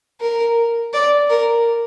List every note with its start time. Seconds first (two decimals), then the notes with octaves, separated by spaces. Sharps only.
0.21 A#4
0.93 D5
1.30 A#4